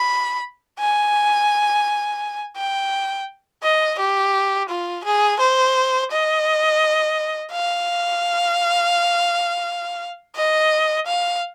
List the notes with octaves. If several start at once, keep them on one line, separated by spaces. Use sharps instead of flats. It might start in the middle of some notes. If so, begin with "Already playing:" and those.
Already playing: B5
G#5
G5
D#5
G4
F4
G#4
C5
D#5
F5
D#5
F5